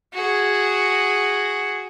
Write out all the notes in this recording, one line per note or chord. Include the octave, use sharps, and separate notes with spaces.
F#4 G#4